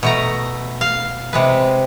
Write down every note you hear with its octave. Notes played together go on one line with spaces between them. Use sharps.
B2 A3 A#5
F5
C3 G#3 B4